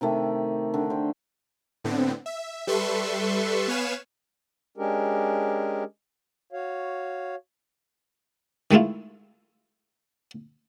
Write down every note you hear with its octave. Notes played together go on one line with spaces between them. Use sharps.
C3 D#3 A3 G4
D3
C5 G5
A2 D3 B3 C4
E5
G3 A4 B4 E5 C6 C#6
B3 B4 C#5 F5 G#5 E7
G#3 C#4 D4 G4 G#4 A#4
F#4 C#5 F5
D#3 G#3 A3 E4 F4